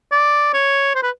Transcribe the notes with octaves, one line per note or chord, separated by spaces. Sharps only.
D5
C#5
C5
B4